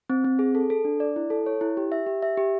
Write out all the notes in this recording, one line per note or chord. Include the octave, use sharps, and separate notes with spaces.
C4
C4
G#4
A4
A4
D4
D5
E4
A4
C#5
E4
G4
E5
G4
E5
G4